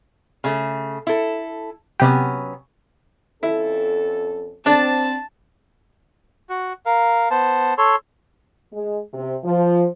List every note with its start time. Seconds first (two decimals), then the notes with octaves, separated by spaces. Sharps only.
0.44 C#3 A3
1.07 E4 A4
2.00 C3 F#3 B3 C#4 G4
3.43 F2 C#4 E4 A4
4.66 C4 D4 A5
6.49 F#4
6.86 A#4 F5
7.31 B3 C5 A5
7.78 A4 C#5 C6
8.74 G#3
9.14 C3
9.45 F3